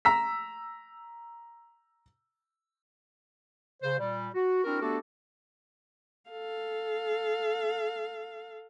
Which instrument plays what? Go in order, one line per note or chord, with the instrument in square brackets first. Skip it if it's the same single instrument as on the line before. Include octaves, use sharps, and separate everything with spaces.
[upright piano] A#5 E6 B6
[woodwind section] C#3 C5
A#2 G3
F#4
C4 D4 E4 F#4 A#4
A3 B3 D4 F#4 G4 A4
[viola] A4 F5